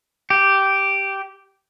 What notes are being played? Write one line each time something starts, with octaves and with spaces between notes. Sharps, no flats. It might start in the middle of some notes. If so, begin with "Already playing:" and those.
G4